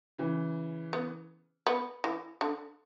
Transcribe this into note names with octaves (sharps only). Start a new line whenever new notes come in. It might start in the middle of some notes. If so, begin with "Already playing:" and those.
C#3 E3
B3
B3
E3
D3